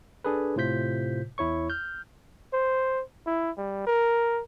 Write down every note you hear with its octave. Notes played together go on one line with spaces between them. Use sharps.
D4 G#4 A4 B4
A2 C3 F4 C5 G6 B6
E2 E4 C#5 C#6
F6 G6
C5
E4
G3
A#4